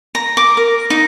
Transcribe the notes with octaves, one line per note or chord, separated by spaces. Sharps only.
A#5
D6
A#4
D#4